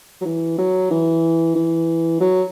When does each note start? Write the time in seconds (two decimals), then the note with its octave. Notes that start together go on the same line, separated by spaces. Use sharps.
0.21 F#3
0.25 E3
0.58 F#3
0.91 E3
1.55 E3
2.20 F#3